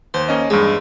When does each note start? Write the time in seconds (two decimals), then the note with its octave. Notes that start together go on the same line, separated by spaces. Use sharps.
0.14 D#2 C5
0.29 A#3 C#4 D#5
0.50 E2 G2 G#3